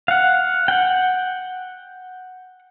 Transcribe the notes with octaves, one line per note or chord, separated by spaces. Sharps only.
F5 F#5
F#5 G5